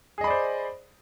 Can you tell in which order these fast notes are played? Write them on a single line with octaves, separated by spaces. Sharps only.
G#4 D#5 B5 D5 C5